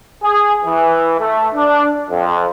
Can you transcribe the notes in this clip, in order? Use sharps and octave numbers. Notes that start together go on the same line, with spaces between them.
G#4
E3
A3
D4
F2